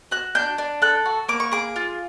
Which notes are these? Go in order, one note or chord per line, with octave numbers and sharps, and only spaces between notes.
F#4 F#6
D4 G6
D4
A4 F#6
F#4
A#3 D6
C#6
G#4 D6
F4